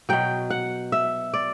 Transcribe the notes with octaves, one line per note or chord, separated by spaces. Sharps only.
B2 F#3 G5
F#5
E5
D5